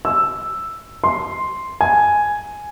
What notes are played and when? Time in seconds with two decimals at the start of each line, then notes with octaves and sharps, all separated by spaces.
0.05 E6
1.04 C6
1.81 G#5